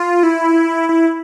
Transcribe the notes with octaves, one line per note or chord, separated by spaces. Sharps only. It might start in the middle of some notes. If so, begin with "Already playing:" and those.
Already playing: F4
E4
E4